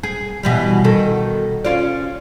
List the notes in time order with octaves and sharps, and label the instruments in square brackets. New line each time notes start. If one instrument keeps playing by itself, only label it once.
[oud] G#4
B2 E3 G3
B2 D#3 A4
C#4 F4 D5